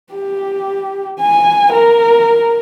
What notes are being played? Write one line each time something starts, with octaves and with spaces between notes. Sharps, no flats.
G4
G#5
A#4